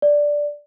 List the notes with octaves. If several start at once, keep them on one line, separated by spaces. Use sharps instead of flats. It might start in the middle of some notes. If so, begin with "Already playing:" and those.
D5